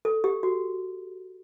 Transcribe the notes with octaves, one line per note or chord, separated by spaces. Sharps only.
A4
G4
F#4